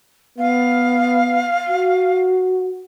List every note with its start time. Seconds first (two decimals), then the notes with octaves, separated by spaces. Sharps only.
0.38 B3 F5
1.69 F#4